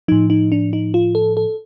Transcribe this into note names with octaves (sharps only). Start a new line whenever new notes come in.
A2 F3 D#4
D#4
D4
D#4
F4
A4
A4